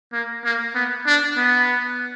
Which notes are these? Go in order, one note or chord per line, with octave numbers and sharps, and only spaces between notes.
A#3
A#3
B3
D4
B3